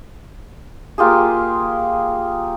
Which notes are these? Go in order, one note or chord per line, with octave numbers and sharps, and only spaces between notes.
A#3 F4 G4 G#4